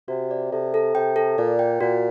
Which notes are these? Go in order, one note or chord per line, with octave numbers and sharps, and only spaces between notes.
C3 F#4
D5
C3 A4
A4
C3 G5
A4
A#2 D5
G5
A#2 F#4